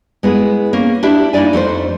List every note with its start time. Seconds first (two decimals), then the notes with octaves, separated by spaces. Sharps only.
0.23 G#3 B3 E4 G#4
0.73 A#3 C#4
1.03 D4 E4 G4 D5 E5
1.33 A#3 D#4 E4 D5 G#5
1.53 F2 A3 F4 C5